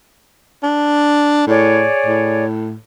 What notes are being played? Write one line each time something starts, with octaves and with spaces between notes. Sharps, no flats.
D4
A2 G#4 C#5 D5
A2